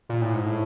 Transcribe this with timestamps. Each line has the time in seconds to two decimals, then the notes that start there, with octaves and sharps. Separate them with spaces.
0.09 A#2
0.21 A2
0.34 G#2
0.46 A2